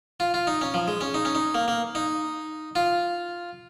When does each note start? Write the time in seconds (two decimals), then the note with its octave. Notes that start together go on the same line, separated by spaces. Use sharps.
0.20 F4
0.34 F4
0.47 D#4
0.61 C#4
0.74 F3
0.88 G#3
1.01 C#4
1.14 D#4
1.25 C#4
1.35 D#4
1.55 A#3
1.68 A#3
1.95 D#4
2.75 F4